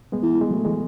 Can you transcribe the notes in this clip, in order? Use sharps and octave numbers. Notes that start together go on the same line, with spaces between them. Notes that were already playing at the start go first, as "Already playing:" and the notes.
G#3 B3
E3
G#3
F#3 A3
E3 G#3